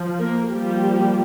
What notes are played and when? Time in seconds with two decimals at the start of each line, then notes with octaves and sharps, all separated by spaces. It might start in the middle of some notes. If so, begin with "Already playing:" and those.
Already playing: F3
0.20 A#3 A#4
0.48 F3 G3 A#3 G4